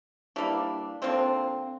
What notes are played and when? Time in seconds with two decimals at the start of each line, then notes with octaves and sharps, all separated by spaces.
0.36 E3 G3 A#3 D4
1.02 D3 F3 A#3 C4